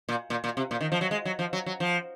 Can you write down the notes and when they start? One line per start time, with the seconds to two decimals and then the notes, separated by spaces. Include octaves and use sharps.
0.09 A#2
0.30 A#2
0.44 A#2
0.57 C3
0.71 A#2
0.81 D#3
0.92 F3
1.01 F#3
1.11 G#3
1.25 F#3
1.39 F3
1.53 F#3
1.66 F#3
1.80 F3